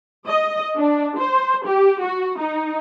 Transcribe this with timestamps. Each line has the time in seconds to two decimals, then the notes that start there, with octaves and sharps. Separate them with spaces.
0.26 D#5
0.76 D4
1.18 C5
1.67 G4
2.03 F#4
2.39 D#4